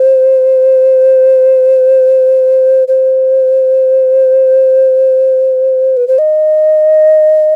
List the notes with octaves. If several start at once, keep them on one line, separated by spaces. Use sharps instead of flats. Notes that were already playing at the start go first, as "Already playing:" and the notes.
Already playing: C5
C5
B4
C5
D#5